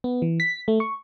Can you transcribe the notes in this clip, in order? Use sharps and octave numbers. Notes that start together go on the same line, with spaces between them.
B3
E3
B6
A3
C#6